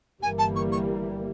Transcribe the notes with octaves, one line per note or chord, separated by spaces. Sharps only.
G1 G2 E3 G3 A#3 G#5
A5
C#6
C#6